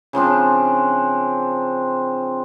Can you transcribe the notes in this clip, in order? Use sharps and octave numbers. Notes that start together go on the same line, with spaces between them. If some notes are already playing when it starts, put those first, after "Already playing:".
C#3 F3 C4 D4